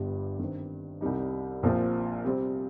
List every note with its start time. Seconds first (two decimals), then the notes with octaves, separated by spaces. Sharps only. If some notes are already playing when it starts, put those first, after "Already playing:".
Already playing: G1 G2 G3
0.39 G2 D#3 C4
1.01 C2 C3 G3 D#4
1.63 A#1 A#2 F3 C4
2.25 C3 G3 C4